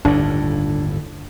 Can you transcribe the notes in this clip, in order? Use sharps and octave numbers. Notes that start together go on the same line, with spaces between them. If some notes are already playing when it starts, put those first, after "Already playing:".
G1 D#2 A2 D4